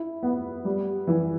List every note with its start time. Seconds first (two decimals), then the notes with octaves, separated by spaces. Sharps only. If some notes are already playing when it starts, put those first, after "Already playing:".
Already playing: E4
0.23 B3
0.65 G3
1.07 E3